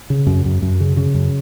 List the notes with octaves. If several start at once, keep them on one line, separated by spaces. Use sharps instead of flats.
C#3
F#2
F#2
F#2
C#3
C#3
F#2